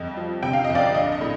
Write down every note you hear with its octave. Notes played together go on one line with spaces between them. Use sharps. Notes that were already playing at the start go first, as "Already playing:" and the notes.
Already playing: F2 G3 D#5
F3
C3 G5
F5
F2 D#5
D5 F5
A#1 D#5
D#5
A2